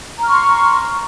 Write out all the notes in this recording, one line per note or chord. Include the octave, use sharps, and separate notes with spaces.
A#5 C6 C#6 F6